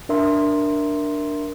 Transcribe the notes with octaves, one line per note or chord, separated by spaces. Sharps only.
D4 A#4 E5 C6